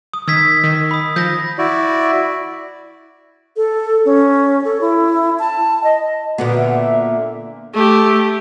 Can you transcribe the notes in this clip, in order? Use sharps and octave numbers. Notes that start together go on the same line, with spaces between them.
D#6
D#3 E6 G#6 B6
D#3
B5 D#6
F3 G6 A#6
E4 F#4 D5
A4
C#4
A4
E4
A5
D#5
A#2 D3 B3 F#4
E5
A3 G4